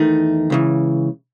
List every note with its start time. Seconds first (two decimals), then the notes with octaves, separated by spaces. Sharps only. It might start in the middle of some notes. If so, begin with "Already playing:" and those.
Already playing: E2 D#3 A3 D#4
0.50 C#2 C#3 E3